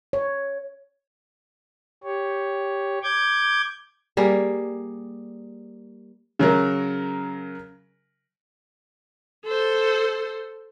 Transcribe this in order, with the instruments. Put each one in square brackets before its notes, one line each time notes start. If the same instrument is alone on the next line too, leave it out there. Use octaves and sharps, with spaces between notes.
[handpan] C#5
[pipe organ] G4 C#5
D6 G6 G#6
[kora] G3 A#3 G#4
[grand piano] C#3 F#3 A#4
[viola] A4 C5